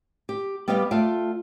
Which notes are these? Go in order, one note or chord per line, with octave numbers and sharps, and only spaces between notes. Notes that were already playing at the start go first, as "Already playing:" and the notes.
G4
G3 B3 G4 B4 D#5 F5
A3 F4 D5 G5